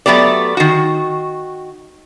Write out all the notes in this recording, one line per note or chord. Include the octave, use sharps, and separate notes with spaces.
F#3 A3 B3 G4 D5
D#3 F#4